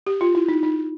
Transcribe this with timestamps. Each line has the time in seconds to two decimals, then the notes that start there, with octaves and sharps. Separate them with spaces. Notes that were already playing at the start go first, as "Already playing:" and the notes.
0.06 G4
0.21 F4
0.35 E4
0.49 D#4
0.63 D#4